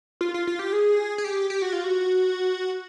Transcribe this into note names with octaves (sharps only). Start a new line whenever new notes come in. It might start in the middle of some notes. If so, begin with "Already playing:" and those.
F4
F4
F4
G4
G#4
G#4
G4
G4
F#4
F4
F#4